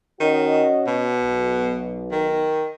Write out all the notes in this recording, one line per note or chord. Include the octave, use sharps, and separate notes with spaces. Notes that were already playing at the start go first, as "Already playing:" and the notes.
D#3 C#4 F#4 D#5
B2
B1
D#3